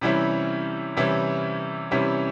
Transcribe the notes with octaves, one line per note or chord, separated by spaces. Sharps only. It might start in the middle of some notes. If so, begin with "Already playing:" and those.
C3 E3 G3 C#4 E4
C3 E3 G3 C#4 E4
C3 E3 G3 C#4 E4